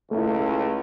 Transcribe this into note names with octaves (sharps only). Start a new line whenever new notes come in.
C#2 A3 E4